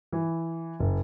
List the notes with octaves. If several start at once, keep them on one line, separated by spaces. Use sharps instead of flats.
E3
F#1